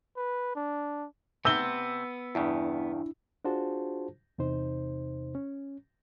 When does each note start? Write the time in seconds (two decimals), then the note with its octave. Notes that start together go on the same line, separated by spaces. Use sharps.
0.17 B4
0.56 D4
1.45 C3 B3 C4 E6 G7
2.35 E2 G2 C#3 D4 E4
3.45 D4 F4 F#4 G#4 C5 A5
4.38 E2 C3 D#4 C5
5.35 C#4